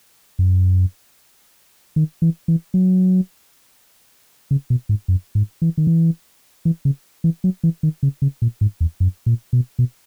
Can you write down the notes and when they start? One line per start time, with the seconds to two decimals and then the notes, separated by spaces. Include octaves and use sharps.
0.39 F#2
1.96 D#3
2.22 E3
2.48 E3
2.74 F#3
4.51 C#3
4.70 B2
4.89 G#2
5.08 F#2
5.35 G#2
5.62 E3
5.78 D#3
5.87 E3
6.65 E3
6.85 C#3
7.24 E3
7.44 F#3
7.64 E3
7.83 D#3
8.03 C#3
8.22 C#3
8.42 A#2
8.61 G#2
8.80 E2
9.00 F#2
9.26 A#2
9.53 B2
9.79 B2